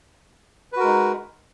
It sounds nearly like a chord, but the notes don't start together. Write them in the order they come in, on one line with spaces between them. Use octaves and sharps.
B4 F#4 A#4 G#3 D#4